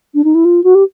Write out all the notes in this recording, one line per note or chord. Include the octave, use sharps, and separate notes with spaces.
D4
D#4
E4
F4
F#4
G4